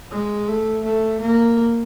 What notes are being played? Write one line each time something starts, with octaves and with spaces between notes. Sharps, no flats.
G#3
A3
A3
A#3